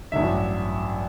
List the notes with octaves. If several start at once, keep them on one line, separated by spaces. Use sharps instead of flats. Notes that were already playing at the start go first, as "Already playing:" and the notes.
A1 G2 D3 F#3 E5